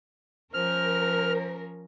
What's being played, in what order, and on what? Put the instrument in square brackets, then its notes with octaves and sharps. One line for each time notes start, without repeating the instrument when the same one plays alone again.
[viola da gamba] F3 C#4 [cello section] A#4 [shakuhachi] C5 [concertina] F6